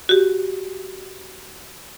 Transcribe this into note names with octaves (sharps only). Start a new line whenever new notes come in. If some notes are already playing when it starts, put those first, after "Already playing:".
F#4 G4